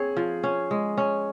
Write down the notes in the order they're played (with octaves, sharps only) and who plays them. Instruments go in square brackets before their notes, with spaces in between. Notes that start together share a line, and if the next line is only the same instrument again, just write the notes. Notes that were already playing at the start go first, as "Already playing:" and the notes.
Already playing: [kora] C4 C#5 [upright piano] G#4
[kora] F3
C#4
G#3
C#4